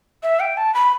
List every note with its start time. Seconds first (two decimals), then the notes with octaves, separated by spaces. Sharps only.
0.23 E5
0.40 G5
0.57 A5
0.74 B5